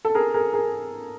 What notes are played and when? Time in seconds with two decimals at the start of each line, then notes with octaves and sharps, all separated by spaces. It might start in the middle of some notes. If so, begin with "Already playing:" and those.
0.05 A4
0.15 G#4 A#4
0.34 G#4 A#4
0.53 G#4 A#4